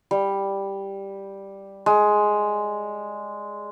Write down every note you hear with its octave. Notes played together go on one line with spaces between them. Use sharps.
G3
G#3